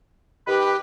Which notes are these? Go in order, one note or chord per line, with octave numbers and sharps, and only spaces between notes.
D#3 G4 B4